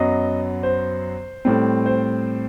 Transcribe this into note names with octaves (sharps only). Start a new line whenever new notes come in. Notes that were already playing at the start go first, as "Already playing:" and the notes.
Already playing: F#2 F#3 B3 D#5
C5
A2 G3 C4
C5